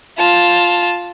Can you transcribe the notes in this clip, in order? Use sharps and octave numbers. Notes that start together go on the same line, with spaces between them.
F4 A5